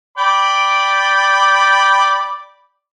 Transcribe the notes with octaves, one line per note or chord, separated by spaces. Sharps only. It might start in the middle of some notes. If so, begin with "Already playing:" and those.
D5 G5 B5